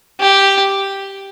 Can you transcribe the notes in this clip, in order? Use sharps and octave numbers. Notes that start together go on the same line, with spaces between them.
G4